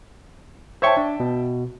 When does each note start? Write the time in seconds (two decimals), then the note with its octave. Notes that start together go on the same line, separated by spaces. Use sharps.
0.82 C5 C#5 E5 G5 A5 C#6
0.97 D4
1.20 B2